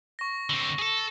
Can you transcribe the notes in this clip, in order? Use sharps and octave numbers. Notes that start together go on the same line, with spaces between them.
C#6 A#6
D3 C4
G#4 A4